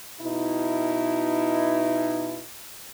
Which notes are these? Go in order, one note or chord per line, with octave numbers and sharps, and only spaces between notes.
B2 D#4 E4